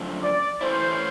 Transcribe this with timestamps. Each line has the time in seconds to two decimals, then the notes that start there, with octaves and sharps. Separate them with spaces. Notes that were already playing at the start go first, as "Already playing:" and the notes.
Already playing: F#2 D3 F3 A3 C#4
0.21 D5
0.61 E3 A3 C#4 E4 C5